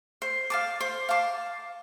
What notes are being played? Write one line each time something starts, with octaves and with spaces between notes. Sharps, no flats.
C5
F5 A5 D6
C5
F5 A5 D6